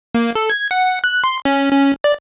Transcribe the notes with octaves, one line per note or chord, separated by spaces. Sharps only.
A#3
A4
G#6
F#5
F#6
C6
C#4
C#4
D5